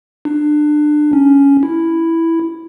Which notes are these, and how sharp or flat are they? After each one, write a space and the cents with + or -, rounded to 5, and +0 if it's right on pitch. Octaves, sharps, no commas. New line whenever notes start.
D4 +25
C#4 +10
E4 +0